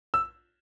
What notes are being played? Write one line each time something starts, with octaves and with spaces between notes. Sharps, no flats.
E6